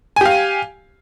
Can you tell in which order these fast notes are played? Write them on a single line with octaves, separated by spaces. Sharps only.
G#5 G4 F5